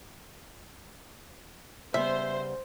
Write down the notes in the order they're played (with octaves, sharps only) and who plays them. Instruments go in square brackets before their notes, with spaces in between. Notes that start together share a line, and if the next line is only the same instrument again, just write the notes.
[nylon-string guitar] C#3 G3 B3 [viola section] C5 [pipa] E5